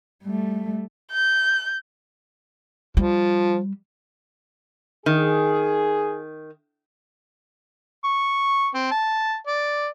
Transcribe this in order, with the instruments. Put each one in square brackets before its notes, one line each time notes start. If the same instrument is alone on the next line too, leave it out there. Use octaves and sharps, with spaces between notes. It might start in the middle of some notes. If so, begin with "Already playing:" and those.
[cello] G3 A3
[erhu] G6
[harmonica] F3 [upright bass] G3
[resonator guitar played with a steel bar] D#3 [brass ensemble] G#4
[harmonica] C#6
C4
A5
D5